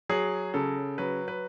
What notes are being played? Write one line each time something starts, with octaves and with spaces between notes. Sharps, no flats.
F#3 G#4
C#3 A4
F#3 B4
B4